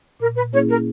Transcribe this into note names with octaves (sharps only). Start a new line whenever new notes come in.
A#2 A#4
B4
A#3 C#4 E4 G#4 C#5
A#4